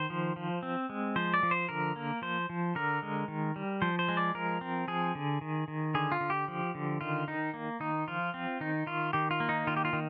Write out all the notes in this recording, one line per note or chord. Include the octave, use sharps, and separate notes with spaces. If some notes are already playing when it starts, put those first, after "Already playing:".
Already playing: D#3 C5
F3
F3
C4
G#3
F3 C5
D5
F3
C5
D3 A#4
A#3
F3 C5
F3
D3 A#4
G#3
D#3
G3
F3 C5
C5
G#3
D5
F3 A#4
C4
F3 G#4
D3
D#3
D#3
D3 G#4
F4
D3
G4
F3
D3
D#3 F4
D#3 D#4
A#3
D#3 D#4
F3 F4
C4
D#3 D#4
D#3 F4
D#3 G4
F4
A#3
D#4
D#3 F4
G4
F4
D#3